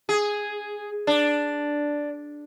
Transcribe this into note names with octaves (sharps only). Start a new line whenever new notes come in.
G#4
D4